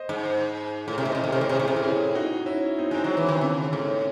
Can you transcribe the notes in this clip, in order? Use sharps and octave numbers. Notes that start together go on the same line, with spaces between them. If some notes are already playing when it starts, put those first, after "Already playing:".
Already playing: C5 D#5
G#2
A2
C3
E5
A2
C5 D#5
C3
A2
C3 A4 C#5
A2
C3 G#4 C5
A2
C3
A2
E4 G#4
D#4 F#4
C#4 E4
C4 D#4
G#3 C4 D#4
F#3
C#4
E3
D#3 C4
C#3 C4
C#4
A2
C4 D#4